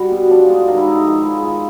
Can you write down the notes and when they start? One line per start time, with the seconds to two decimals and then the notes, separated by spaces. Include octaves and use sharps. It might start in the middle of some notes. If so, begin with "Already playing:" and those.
Already playing: G3 F#4
0.11 B2
0.30 F3 D4
0.49 G#3
0.68 D#3 F4
0.77 E4
0.87 G#3 D#4
0.96 E4
1.06 F3
1.25 G#3
1.44 D#3 F4